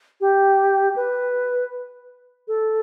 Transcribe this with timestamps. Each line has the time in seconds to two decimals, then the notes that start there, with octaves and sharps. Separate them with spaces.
0.21 G4
0.96 B4
2.48 A4